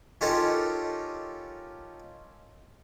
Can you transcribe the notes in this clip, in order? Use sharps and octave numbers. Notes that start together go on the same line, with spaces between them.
C#4 D#4 F4 G4 A4 A#4